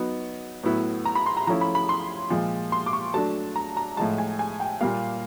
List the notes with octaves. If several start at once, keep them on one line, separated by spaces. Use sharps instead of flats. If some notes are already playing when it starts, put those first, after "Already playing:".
Already playing: F#3 B3 D#4
A2 F#3 B3 E4
A#5
B5
C6
A#5
F3 A3 C#4 E4 A#5
B5
B5
C6
A#2 F3 G#3
C6
D6
C#6
F#3 A3 D4 A5
A#5
A#5
A2 F3 G#3 A5
G#5
G#5
G5
A#2 G3 A#3 F5